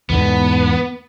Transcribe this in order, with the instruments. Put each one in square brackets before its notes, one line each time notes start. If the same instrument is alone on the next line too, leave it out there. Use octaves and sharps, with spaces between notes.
[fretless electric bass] E2 G#2 D3 [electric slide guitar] B3